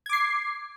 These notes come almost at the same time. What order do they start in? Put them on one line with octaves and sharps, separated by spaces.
G#6 D6 C7